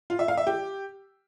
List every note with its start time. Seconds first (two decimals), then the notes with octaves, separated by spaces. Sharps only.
0.10 F4
0.19 E5
0.28 F5
0.37 E5
0.47 G4